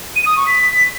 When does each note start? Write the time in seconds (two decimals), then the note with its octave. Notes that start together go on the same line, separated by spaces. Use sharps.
0.16 D#7
0.26 D#6
0.36 C#6
0.47 B6